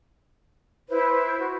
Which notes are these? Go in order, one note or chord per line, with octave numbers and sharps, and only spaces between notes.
E4 B4 C5
F#4